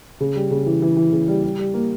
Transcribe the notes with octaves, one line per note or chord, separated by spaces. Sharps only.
C#3
G3
C#3
E3
E3
E3
C#3
G3
G3
G3
A#3